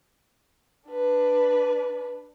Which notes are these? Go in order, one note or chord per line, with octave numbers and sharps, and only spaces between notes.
D4 B4